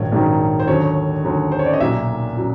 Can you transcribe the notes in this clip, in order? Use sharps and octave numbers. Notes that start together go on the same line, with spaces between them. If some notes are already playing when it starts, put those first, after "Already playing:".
Already playing: A#1 G#2 D#3 F#3 C#5
A#1 G#2 D#3 F#3
C5
D#2 D3 F#3 C#5
D#2 D3 F#3
C5
C#5
D5
D#5
B1 A#2 F#3 E5
A#2 F#3